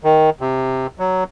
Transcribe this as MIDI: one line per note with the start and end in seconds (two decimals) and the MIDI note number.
0.04 0.30 51
0.41 0.87 48
0.99 1.24 54